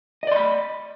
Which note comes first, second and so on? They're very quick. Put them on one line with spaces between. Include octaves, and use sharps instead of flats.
D#5 D5 C6 B5